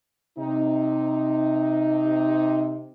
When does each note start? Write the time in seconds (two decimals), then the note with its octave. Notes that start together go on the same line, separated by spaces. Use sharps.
0.38 C3 D#4